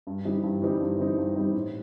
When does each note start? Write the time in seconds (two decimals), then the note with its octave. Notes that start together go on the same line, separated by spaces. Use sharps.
0.07 G2
0.25 E3 G3 C4 D#4
0.43 G2
0.62 E3 G3 C4 D#4
0.80 G2
0.99 E3 G3 C4 D#4
1.17 G2
1.36 E3 G3 C4 D#4
1.54 A2